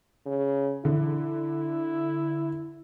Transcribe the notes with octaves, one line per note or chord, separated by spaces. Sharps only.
C#3
D3 E4